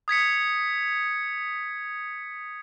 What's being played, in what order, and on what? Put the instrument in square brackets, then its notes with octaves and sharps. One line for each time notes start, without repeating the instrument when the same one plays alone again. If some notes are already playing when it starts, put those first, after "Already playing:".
[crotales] D#6 G#6 B6 C#7